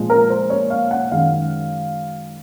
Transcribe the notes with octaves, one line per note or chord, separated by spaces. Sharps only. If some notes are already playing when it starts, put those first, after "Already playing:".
Already playing: A#2 F3 G#3
A#4
C5
C#5
F5
F#5
F#2 D#3 G#3 F5